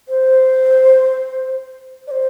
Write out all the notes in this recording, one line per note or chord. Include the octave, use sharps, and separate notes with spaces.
C5
D5
C5